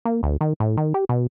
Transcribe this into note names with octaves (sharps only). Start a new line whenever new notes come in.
A#3
D2
D#3
A2
D#3
G4
B2